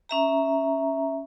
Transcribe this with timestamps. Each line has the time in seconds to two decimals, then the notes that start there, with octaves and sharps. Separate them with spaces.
0.09 C#4 E5 A#5